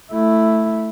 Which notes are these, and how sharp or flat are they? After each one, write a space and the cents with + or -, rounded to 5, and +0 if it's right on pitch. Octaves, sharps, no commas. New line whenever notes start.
A3 +0 E4 +0